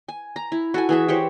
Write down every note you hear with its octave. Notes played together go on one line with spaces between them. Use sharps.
G#5
A#5
E4
F#4 A4 G#5
E3 G#4 E5
E3 G4 C5 C#5